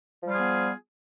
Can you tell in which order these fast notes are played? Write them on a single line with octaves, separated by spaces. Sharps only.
F3 G3 F4 G#4 B3